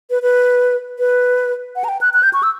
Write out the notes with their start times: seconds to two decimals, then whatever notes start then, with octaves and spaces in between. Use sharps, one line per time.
0.10 B4
0.22 B4
0.99 B4
1.76 F#5
1.84 A#5
1.89 G5
2.01 F#6
2.14 F#6
2.23 G6
2.33 C#6
2.43 E6